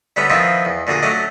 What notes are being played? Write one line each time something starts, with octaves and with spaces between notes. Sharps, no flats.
D3 G3 B3 C#4 E5
D#3 F3 B3 C4 E4 F4
E2
A#2 D3 F#4 G#4
F#3 A3 C#4 D4 D5 D#5